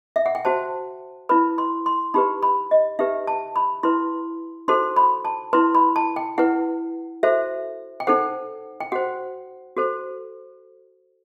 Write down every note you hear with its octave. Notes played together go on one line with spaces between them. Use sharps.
E5
F#5
G5
F#4 C5 A5
E4 B4 B5
C6
C6
D#4 G4 B4 B5
B5
D#5
D#4 G4 B4 E5
A5
B5
E4 B4 C6
D#4 F#4 A4 C5 C6
B5
A5
E4 B4 C6
B5
A5
G5
E4 B4 F#5
F#4 A4 C5 E5
G5
D#4 A4 C5 F#5
G5
F#4 C5 F#5
F#4 A4 C5